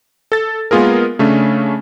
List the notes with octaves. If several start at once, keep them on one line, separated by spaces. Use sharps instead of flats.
A4 A6
G#3 A#3 B3 F4 G#4 A#4
C#3 A3 C#4 D4